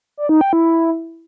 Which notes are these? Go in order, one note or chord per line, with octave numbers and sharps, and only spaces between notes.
D5
D#4
G5
E4